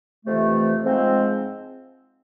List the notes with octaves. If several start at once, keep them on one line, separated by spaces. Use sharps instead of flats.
F2 C3 E3 A3
G#2 F3 G#3 C4